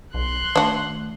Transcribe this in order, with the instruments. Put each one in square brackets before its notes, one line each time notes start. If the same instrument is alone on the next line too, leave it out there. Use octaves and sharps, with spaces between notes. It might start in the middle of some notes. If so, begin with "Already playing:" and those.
[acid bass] B1 [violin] C6 F#6
[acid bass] D#3 [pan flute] A3 [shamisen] D4 F#4